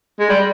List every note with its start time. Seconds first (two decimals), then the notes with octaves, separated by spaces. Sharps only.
0.20 G#3
0.30 G3